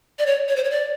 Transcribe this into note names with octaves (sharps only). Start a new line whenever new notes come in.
D5
C#5
C#5
C5
C#5
D5